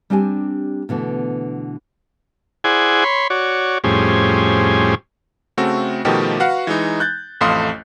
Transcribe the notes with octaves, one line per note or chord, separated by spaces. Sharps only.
G3 C4 D4 G4 G#5
B2 D3 E3 A3
E4 G#4 C5 D5 F#5 G#5
C#5 B5 C6
F#4 C#5 D5
F2 A2 G3 C#4 G#4 C5
C#3 A3 C4 F#4 A4
B2 D#3 F3 A3 F#4 G4
F#4 B4 F5 F#5
E3 G#3 D#4
F#6 G6 A6
A1 F2 A3 F5 C6 D#6